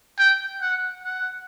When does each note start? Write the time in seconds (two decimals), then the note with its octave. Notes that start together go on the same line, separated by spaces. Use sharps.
0.19 G5
0.62 F#5
1.04 F#5